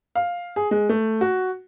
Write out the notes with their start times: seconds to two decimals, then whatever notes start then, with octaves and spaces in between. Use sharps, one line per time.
0.15 F5
0.56 G#4
0.71 G#3
0.89 A3
1.21 F#4